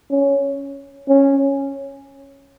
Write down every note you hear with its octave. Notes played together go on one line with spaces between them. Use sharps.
C#4
C#4